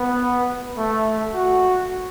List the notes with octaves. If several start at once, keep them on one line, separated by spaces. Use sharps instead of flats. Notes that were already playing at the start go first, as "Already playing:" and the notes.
Already playing: B3
A3
F#4